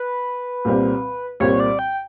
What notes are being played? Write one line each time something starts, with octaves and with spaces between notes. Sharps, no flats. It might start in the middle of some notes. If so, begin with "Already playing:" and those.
Already playing: B4
C2 A#2 G3 C4
C2 A#2 G3 C4 C#5
D5
G5